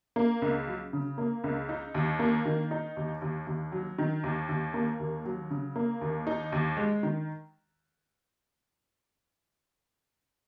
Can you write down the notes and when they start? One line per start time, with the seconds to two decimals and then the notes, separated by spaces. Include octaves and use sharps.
0.16 A#3
0.42 C#2
0.67 F#3
0.93 C#3
1.18 A#3
1.44 C#2
1.69 D#4
1.95 D#2
2.19 A#3
2.45 D#3
2.71 D#4
2.97 D#2
3.22 D#2
3.47 D#2
3.72 F#3
3.98 D#3
4.24 D#2
4.49 D#2
4.74 A#3
5.00 D#2
5.25 F#3
5.50 C#3
5.76 A#3
6.01 D#2
6.27 D#4
6.52 D#2
6.77 G#3
7.03 D#3